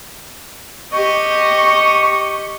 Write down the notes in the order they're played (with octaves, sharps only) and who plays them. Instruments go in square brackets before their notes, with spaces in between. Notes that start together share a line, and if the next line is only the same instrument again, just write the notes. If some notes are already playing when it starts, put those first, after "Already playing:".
[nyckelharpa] G4 D#5 [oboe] C#6